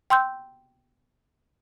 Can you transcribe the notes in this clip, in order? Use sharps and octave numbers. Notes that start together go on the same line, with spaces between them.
G5 C6 E6 G6